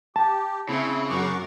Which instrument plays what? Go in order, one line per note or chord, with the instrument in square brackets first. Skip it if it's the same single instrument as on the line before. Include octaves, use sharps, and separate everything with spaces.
[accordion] G4 [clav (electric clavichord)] A5
[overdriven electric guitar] C#3 [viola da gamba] C4 [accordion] E4
[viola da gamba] F#2 A#4 [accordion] F#4 C#6 D6